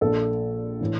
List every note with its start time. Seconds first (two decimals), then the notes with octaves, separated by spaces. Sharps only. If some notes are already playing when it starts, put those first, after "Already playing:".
0.01 A#1 A#2 A4
0.81 A2 E3